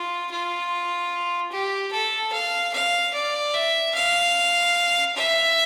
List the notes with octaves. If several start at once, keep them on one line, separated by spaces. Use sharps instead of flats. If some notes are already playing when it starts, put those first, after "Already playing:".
Already playing: F4
F4
G4
A4
F5
F5
D5
E5
F5
E5